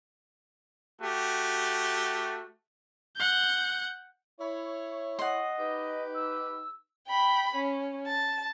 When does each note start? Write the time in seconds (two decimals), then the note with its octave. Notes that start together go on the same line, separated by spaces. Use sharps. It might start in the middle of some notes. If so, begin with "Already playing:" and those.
1.00 A3 F#4 G4
3.16 F#5 G6
4.40 E4 C#5
5.19 D#5 F#5 C6
5.59 D#4 G4 B4
6.15 E6
7.08 G5 B5
7.56 C#4
8.07 A5